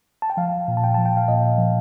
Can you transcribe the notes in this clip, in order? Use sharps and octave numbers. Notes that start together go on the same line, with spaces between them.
A5
G5
F3 F5
A#2
A5
G5
F3 A5
G5
F5
A#2 D#5
F3